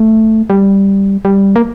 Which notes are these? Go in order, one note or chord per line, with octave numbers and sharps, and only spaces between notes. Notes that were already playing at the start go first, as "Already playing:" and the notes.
Already playing: A3
G3
G3
A#3